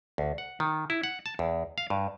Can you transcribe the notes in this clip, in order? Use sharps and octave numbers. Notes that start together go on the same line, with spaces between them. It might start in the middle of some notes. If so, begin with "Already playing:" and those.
D2
F#5
D#3
E4
F#5
A5
E2
F5
G2